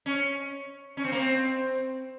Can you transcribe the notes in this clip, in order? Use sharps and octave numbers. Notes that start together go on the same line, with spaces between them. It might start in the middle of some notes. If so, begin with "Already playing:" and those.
C#4
C#4
C4
A#3
C4